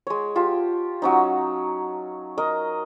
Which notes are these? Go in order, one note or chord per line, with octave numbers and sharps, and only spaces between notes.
G#3 C#5
F4 G4 A5
F#3 C#4 D#4
A#4 D#5